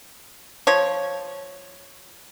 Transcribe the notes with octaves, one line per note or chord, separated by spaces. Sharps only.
F3 C#5